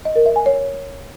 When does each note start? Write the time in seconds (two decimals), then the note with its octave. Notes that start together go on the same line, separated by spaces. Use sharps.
0.05 D#5
0.16 A#4
0.26 E5
0.36 G#5
0.46 C#5